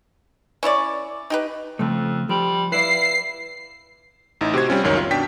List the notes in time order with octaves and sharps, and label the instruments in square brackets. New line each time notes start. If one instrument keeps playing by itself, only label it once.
[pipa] C#4 E4 C#5 D5
D#4 G4 B4
[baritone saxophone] F2 [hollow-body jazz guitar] C#3 F3 A3
[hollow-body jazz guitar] F3 [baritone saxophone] G3
[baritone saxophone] E4 [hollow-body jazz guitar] B4 D5 F5 [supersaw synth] C7
[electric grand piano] A1 D#4 E4
C3 F#4 G4 C5 G#6
G3 C4 C#4 F4
G1 C#2 F#2 D#3 C#5
F4
B2 D4 G5 B6